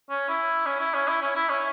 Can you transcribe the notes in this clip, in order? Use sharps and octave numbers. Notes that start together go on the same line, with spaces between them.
C#4
E4
C#4
E4
C#4
E4
C#4
E4
C#4